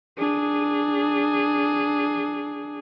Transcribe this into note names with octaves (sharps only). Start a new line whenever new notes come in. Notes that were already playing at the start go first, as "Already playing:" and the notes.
D4 G#4